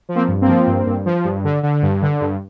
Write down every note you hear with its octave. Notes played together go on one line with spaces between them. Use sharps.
F3
A#3 C4
G2
A#3 C4
F3
G2
G2
F3
G2
D3
D3
G2
D3
G2